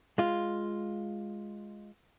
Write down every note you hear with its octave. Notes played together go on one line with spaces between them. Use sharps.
G#3 F4